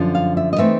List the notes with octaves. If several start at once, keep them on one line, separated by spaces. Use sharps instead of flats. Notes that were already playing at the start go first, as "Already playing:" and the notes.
Already playing: F#2 D3 F3
F5
E5
D#5
E3 A3 C4 D#4 E5